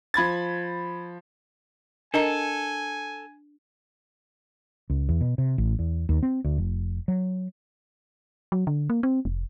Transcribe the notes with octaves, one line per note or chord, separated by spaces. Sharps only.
F3 B5 G#6 A6
D4 A4 A#4 D#5 G#5 A#5
C#2
E2
B2
C3
A1
E2
D#2
C4
D2
F1
F#3
F#3
D3
A#3
C4
F1